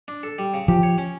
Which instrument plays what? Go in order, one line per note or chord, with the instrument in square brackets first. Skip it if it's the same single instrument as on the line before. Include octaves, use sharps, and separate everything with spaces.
[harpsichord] D4
A4
G3
C#3
[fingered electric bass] F3 [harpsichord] G4
[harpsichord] C#5
C#4